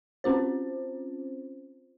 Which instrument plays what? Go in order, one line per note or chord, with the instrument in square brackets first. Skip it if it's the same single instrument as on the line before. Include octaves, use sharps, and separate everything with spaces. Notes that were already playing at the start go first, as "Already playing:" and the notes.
[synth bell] C4 C#4 F4 C5